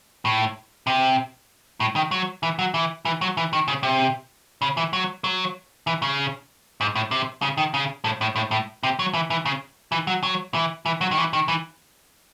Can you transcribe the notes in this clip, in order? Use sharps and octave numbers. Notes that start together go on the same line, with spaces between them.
A2
C3
A2
D#3
F#3
E3
F#3
E3
E3
F#3
E3
D#3
C#3
C3
C#3
E3
F#3
F#3
E3
C#3
G#2
A2
C3
C#3
D#3
C#3
A2
A2
A2
A2
C3
F#3
E3
E3
C#3
E3
F#3
F#3
E3
E3
F#3
D#3
E3
D#3
E3